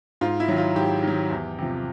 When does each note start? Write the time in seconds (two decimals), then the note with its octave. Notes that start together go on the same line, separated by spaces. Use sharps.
0.21 G#2 F4
0.40 E4
0.48 D#3 F#3
0.58 F4
0.76 G#2 G4
1.03 D#3 F#3
1.30 E2
1.58 C3 F3